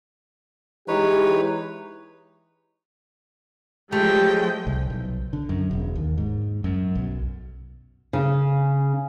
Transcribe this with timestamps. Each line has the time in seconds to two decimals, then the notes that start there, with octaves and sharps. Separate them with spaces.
0.88 E3 G#3 D#4 G4 B4 C#5
3.92 F3 F#3 G#3 A3 G4 G5
4.67 C2
4.90 B1
5.33 D3
5.49 F#2
5.71 E1
5.96 D#2
6.18 G#2
6.64 F#2
6.95 B1
8.13 C#3